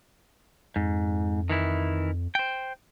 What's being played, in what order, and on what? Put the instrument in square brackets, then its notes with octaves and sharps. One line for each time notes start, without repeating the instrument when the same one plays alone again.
[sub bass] F2 [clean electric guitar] G#2
[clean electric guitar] D#3 E3 E4
C5 G5